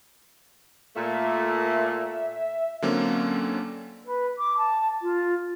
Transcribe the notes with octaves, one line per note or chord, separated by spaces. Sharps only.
A#2 A3 E5
D3 F#3 A#3 C4 C#4
B4
D6
A5
F4